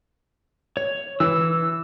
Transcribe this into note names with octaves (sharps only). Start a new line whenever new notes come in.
C#5
E3 E6